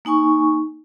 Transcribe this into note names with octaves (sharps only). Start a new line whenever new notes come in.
A#3 D#4 G#5 C#6